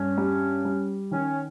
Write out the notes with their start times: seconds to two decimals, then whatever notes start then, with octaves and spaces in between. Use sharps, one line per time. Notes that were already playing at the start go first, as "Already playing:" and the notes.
Already playing: G2 C#4
0.18 G3
0.65 G3
1.11 D#3 C#4